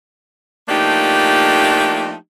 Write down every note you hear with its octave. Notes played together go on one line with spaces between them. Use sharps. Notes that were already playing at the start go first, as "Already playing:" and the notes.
F3 A3 A#3 D4 D#4 G4